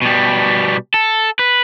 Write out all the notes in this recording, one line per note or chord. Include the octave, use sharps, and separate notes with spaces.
B2 G3
A4
B4